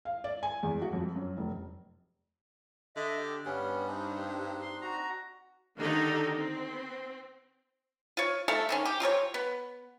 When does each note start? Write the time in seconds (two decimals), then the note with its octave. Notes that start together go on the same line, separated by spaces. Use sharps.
0.05 F5
0.24 D5
0.43 G#5
0.63 E2
0.82 F#4
0.93 F2
1.16 F#2
1.37 F1
2.96 D3 D#5 E5
3.18 G4
3.45 G2 G3 B3 C#4
3.88 C4 D4 D#4
4.62 C6
4.82 F#4 A#5
5.77 D3 D#3 D4 D#4 G4 A4
6.34 C4
8.17 F4 C#5
8.48 A3 A4 F5 A5
8.69 D3 D#3 C#4
8.85 G4
9.00 F4 G4 A4 C#5
9.34 B3